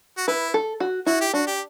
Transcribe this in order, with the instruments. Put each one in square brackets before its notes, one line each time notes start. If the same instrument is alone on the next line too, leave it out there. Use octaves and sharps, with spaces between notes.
[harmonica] F#4
[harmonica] E4 [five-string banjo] B4
[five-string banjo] A4
F#4
[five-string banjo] E4 [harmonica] F#4
[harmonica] G4
[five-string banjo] D4 [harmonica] F#4
[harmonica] G4